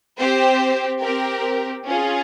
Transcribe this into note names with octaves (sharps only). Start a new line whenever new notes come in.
C4 G4 C5
C4 G4 A#4
C#4 F4 G#4